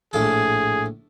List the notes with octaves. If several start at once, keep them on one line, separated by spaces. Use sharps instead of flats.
A#1 A2 G#4 A4